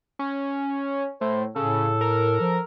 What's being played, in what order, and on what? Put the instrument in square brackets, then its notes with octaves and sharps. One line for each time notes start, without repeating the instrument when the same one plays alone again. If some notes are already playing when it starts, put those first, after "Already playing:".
[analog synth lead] C#4
[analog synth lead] A2 [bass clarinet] C5
[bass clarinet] A2 [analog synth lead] C#3 [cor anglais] A4
[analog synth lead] A#4
[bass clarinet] F3